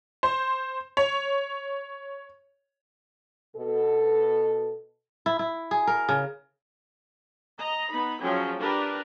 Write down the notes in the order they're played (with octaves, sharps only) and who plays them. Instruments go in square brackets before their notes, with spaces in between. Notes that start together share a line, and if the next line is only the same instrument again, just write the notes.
[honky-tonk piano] C5
C#5
[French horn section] B2 A4
[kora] E4
E4
G#4
A#4
C#3
[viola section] D#5 A#5
B3 D#4 B5
F3 F#3 C#4 G#4 G5
D4 G4 A#4 B4